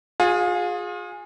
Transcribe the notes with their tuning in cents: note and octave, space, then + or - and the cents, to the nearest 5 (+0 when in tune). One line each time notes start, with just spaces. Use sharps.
F4 +35 G#4 -5